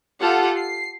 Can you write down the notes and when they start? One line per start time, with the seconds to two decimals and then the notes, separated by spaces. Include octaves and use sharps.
0.21 F4 G4 A4 F#5
0.58 C7